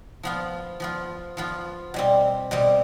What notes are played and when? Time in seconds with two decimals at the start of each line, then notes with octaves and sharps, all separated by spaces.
0.23 F3 B3 F4
0.80 F3 B3 F4
1.37 F3 B3 F4
1.94 B2 G3 C4
2.51 B2 G3 C4